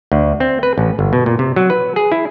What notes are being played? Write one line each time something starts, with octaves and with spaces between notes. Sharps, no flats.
D2
C4
B4
A1
G1
B2
A#2
C3
F#3
B4
G#4
E4